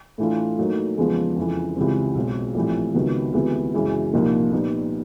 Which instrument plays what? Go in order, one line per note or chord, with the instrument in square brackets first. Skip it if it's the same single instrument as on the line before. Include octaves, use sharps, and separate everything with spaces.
[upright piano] A2 E3 A3 D4 F4
A2 F#3 A#3 D#4
E2 C#3 F3 G#3 B3
F2 C#3 E3
C#2 C3 E3 G3 C4
B1 B2 G#3 C4
A#1 A2 E3 G3 C4
C#2 C3 D#3 F#3 B3
D2 C3 E3 G#3 B3
F#2 C#3 E3 G#3
C2 A#2 F3 A#3 D#4
A#2 G3 B3 D#4